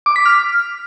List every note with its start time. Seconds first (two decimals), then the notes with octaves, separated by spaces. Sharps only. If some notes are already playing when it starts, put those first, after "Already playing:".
0.06 D6
0.16 B6
0.26 F6